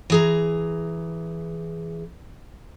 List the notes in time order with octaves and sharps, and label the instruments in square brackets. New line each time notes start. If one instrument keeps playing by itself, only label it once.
[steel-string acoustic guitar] E3 G#4 A#5